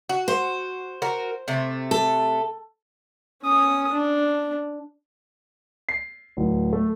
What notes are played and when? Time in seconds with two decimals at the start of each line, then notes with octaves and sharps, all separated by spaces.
0.09 F#4
0.28 C5
1.02 F#4 A#4
1.48 C3 A3
1.91 A4
3.43 C#4 D#6
3.93 D4
5.89 C7
6.37 D1
6.73 A3